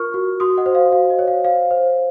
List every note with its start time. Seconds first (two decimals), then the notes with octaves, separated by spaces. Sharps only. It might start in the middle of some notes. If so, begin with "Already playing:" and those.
Already playing: F4 A#4 C#6 F6
0.14 F#4
0.40 F#4 C6 D#6
0.57 D#5 F#5
0.66 C5
0.75 F5
0.92 F#4 F5
1.10 D#5
1.19 C#5
1.27 F5
1.44 C5 F5
1.71 C5